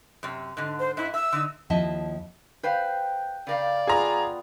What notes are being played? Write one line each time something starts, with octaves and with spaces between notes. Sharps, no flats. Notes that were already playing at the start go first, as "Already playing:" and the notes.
F#2 C3
G#2 D3
C5
G#2 E4 E5
E5 E6
D3 D#4
D#2 F3 E4 D#5 E5 A5
B4 C5 F5 G5
C#3 A#4 D5 F5
B3 F4 G#4 A#5